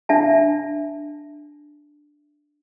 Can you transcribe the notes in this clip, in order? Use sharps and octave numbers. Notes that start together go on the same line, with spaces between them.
D4 E5 A5